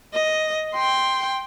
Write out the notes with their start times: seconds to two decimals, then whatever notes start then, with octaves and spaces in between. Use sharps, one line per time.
0.14 D#5
0.74 G5 C6